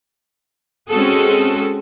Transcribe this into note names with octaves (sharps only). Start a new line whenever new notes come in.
G#3 C4 C#4 F#4 G#4 A4